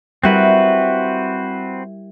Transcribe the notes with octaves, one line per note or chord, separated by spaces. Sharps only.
G3 C4 E4 F#4 A#4 B4